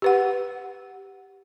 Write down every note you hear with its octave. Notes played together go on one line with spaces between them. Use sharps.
G4 B4 F#5